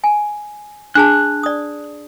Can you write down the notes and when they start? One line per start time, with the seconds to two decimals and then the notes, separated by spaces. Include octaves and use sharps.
0.04 G#5
0.95 D4 G#4 A5 F#6
1.43 D5 D#6